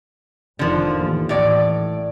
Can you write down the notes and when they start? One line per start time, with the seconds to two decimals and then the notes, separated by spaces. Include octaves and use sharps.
0.59 F1 D3 D#3 F3
0.96 A1 D#2 E3
1.29 A1 A2 D5